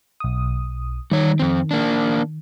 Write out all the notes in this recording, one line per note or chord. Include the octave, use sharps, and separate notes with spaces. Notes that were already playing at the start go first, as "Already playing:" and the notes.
B1 D#6
D#3 G3 C#5
F2 C4
A#3 D4